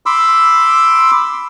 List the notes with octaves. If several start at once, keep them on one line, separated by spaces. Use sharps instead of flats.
B5 C6 D6 E6